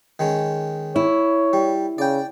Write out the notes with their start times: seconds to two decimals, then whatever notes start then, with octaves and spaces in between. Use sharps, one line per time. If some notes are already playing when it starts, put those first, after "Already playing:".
0.19 D#3 G#3 C#4
0.96 E4 C#5
1.53 G3
1.98 C#3 D5 G5